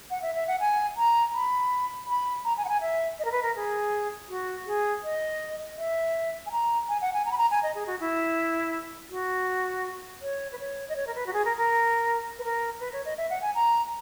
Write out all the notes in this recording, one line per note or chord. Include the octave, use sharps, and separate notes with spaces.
F#5
E5
E5
F#5
G#5
A#5
B5
B5
A#5
G#5
F#5
G#5
E5
D#5
A#4
B4
A#4
G#4
F#4
G#4
D#5
E5
G#5
A#5
G#5
F#5
G#5
A#5
B5
A#5
G#5
D#5
G#4
F#4
E4
F#4
C#5
B4
C#5
D#5
C#5
A#4
B4
F#4
G#4
A#4
A#4
B4
A#4
B4
C#5
D#5
E5
F#5
G#5
A#5